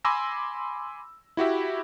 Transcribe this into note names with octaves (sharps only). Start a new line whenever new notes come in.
G#5 B5 C6 D6 E6 A#6
E4 F#4 G4 E5